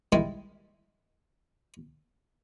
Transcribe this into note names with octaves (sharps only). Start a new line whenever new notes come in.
D#3 G3 G#3 E4